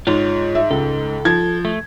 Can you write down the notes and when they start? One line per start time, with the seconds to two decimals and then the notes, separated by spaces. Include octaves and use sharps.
0.07 G#2 F4 C#5
0.55 E5
0.71 C#2 A4
1.25 F3 G#6
1.65 A3